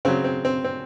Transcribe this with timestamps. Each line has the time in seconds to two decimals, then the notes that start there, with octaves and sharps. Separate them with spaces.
0.05 C#3 F#3 C4
0.24 C4
0.45 C4
0.64 C4